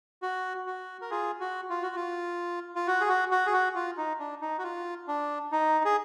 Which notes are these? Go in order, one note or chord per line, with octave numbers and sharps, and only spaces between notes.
F#4
F#4
A#4
F4 G#4
F#4
F4
F#4
F4
F4
F#4
G#4
F#4
F#4
G#4
F#4
F4
D#4
D4
D#4
F#4
F4
D4
D#4
G#4